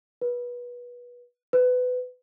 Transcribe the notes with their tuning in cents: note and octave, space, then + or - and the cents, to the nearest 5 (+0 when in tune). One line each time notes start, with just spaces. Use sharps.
B4 -25
B4 +20